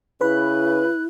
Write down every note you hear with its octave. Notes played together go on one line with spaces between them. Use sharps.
C#3 E4 B4 B5 F#6